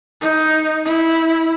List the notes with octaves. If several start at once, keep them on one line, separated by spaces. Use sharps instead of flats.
D#4
E4